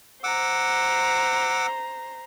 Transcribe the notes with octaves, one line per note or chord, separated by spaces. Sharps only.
C5 F#5 A#5 D6 E6